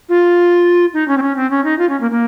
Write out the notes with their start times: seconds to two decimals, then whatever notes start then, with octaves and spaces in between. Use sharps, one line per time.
0.09 F4
0.94 D#4
1.08 C#4
1.18 C4
1.22 C#4
1.36 C4
1.51 C#4
1.64 D#4
1.79 F4
1.89 C#4
2.01 A#3
2.11 A#3